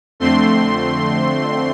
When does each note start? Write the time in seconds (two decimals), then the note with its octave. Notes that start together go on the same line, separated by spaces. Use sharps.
0.20 F2 D3 A3 C4 C6